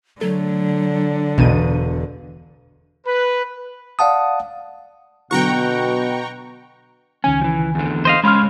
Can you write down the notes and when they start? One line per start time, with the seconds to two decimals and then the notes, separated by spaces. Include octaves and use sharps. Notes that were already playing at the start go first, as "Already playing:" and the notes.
0.21 D3 F#3 A3
1.38 E1 B1 B2 D#7
3.06 B4
3.99 D5 F5 F#5 A5 D#6
5.31 B2 D3 F#3 B3 F#5 G5 A#5 C#6
7.24 C#2 D#3 C#4 G#5
7.41 E3 F3
7.75 E2 D3
8.05 C5 D#5 F5
8.24 G#3 C#4 C#5 F5 B5 C6 F6